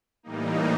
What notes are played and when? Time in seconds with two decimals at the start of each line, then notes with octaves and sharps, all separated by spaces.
0.23 A2 E3 G3 A#3 D#4